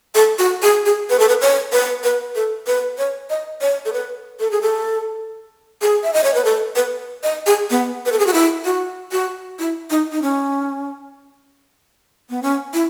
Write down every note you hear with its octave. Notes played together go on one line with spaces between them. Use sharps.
A4
F#4
G#4
G#4
B4
A4
B4
C#5
B4
B4
A4
B4
C#5
D#5
C#5
A4
B4
A4
G#4
A4
G#4
E5
D#5
C#5
B4
A4
B4
D#5
G#4
B3
B4
A4
G#4
F#4
E4
F#4
F#4
E4
D#4
D#4
C#4
B3
C#4
E4